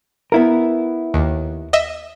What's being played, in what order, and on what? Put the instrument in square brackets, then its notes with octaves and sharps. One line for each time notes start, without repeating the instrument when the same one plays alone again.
[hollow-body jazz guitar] B3 E4 A#4
[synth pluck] D#2
D#5 E5